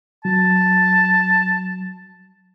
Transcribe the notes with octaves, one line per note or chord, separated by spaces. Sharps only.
F#3 A5